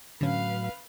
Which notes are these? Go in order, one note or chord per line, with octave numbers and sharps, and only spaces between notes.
A2 D3 F#3 C#4 B4 F5